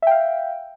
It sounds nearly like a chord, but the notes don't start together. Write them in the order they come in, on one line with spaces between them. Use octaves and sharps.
E5 G5 F5